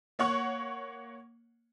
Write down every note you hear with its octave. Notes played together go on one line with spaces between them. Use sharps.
A#3 C#5 F#5 C#6